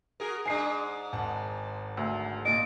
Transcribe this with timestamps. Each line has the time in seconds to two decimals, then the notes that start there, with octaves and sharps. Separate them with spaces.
0.20 F#4 G#4 A#4
0.45 G#2 D4 G#5 C7
1.13 G#1 F#5 A5
1.97 D2
2.45 A#2 D#5 D7